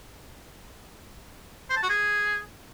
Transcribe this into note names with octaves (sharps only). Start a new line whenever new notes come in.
C5
A5
F#4
G#4